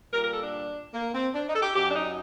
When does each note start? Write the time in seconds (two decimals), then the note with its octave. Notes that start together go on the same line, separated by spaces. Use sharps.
0.13 A#2 G3 A#4
0.23 A#4
0.33 A4
0.43 D4
0.94 A#3
1.14 C4
1.35 D4
1.49 D#4
1.55 A4
1.62 G4
1.75 F#2 F#3 G4
1.91 D4
1.96 D#4